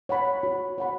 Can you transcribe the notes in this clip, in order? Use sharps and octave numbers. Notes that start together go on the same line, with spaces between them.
C#5 F#5 B5
F#4
C#5 F#5 B5